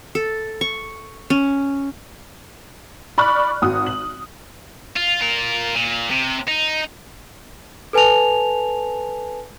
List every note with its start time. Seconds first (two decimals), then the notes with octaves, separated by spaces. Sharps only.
0.15 A4
0.61 C#6
1.30 C#4
3.18 D5 B5 C#6 F6 F#6
3.62 G#1 F#4 D#6
3.87 F#7
4.97 F4
5.21 F4 A#4
5.75 A#2
6.11 C3
6.48 D#4
7.93 A4 B4 G#5 A5 F7